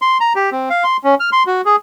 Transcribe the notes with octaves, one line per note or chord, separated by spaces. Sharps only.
C6
A#5
G4
C4
F5
C6
C#4
F6
C6
F#4
G#4